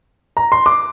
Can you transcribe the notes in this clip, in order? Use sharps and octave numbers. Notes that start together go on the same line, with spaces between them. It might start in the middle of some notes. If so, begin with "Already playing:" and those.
A#5
C6
D6